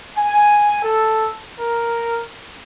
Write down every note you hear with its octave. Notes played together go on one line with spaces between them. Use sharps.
G#5
A4
A#4